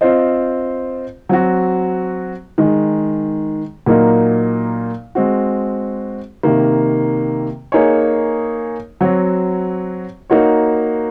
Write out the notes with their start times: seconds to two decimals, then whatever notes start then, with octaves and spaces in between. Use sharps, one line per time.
0.01 C4 F4 C5 D#5
1.29 F#3 C4 F#4
2.58 D#3 G#3 D#4
3.86 A#2 F#3 A#3 D#4 A#4
5.15 G#3 C4 F#4
6.43 C3 D#3 A#3
7.72 A#3 D#4 G#4 C#5
9.01 F#3 C4 F#4 C#5
10.30 A#3 D#4 F#4 C#5